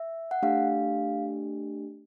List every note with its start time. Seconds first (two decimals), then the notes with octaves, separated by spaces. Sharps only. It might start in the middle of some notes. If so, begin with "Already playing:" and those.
Already playing: E5
0.31 F#5
0.42 A3 D4 G4 F5